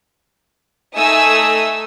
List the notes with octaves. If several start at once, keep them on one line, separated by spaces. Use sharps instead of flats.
A3 D#4 E5 G#5 D#6 E6